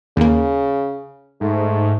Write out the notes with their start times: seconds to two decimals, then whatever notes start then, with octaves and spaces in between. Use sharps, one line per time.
0.17 D#2 C#3 A#3
1.41 G#2 A3